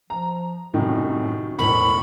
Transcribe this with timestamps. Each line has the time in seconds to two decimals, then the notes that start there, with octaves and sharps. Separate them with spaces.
0.10 F3 A#5
0.74 C2 F#2 A2 D#3 D#4 F#4
1.58 E1 B1 A2 A#4 C5 B5 C#6